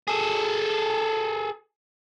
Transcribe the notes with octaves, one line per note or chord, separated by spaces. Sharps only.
G#4 A4